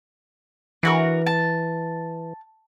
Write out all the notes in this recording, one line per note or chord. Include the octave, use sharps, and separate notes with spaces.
E3 D4 F#4 A#4
A5